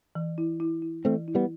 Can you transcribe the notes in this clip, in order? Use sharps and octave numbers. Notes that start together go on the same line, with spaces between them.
E3
E4
E4
E4
E3 A3 C4
E4
G3 B3